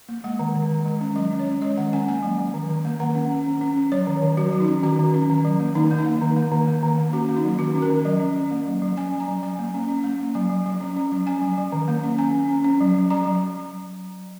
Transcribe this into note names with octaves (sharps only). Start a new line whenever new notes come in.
A#3
G#3 F#5
D#3
D#3
D#3
G#3
C#4
F#3 D#5
C#4
C#5
C#4
G#3 D#5
D#3 F#5
C#4 G#5
A#3 G#5
F#3
F#3
D#3
D#3
A#3
D#3 F#5
C#4
C#4
C#4
C#4
C#4
F#3 C#5
D#3
D#3
F#3 F#4
F#3
D#4
C#4
D#3 F#4
D#3
C#4
D#3
F#3
A#3
D#3 D#4
A#3
D#4
A#3
D#3
A#3
D#3
A#3
D#3
A#3
C#4 F#4
A#3
D#4
F#3
D#3 F#4
C#4
A#4
D#3
F#3 D#5
C#4
C#4
A#3
F#3
F#3
C#4 G#5
F#3
A#5
F#3
F#3 G#5
A#3
C#4
C#4
A#3
A#3
F#3 G#5
F#3
F#3
C#4
C#4
F#3
C#4 G#5
F#3
F#3
D#3
A#3
C#4
C#4 G#5
C#4
C#4
C#4
F#3
F#3
F#3 A#5
F#3